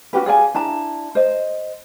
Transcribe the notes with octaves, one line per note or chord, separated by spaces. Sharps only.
C#4 F#4 G4 B4
G#4 D5 F5 G#5
D4 E4 A5 A#5
C5 D#5